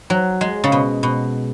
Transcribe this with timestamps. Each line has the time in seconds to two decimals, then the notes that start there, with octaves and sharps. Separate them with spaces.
0.10 F#3
0.41 G#3
0.64 C#3
0.72 B2
1.03 B2